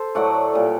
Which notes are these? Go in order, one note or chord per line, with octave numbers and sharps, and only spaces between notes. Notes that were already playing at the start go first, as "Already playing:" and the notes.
Already playing: A4 C5
A2 F#3 A3 D5 F#5
A#2 G3